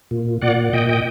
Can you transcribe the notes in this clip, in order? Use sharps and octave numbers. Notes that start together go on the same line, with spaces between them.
A#2
A#2 D5 F#5
A#2 D#5 G5
D#5 G5